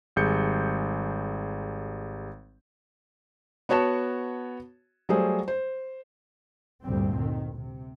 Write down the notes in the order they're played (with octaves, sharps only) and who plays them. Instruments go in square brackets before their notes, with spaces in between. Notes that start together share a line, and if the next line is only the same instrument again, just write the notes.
[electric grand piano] G#1 G3 G#4 G6 C#7
[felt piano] B3 F#4 C#5 A5 E7
F#3 G3 A3 G#4 C5
C5
[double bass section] G1 D2 A#2 G3 C4
D#3
C3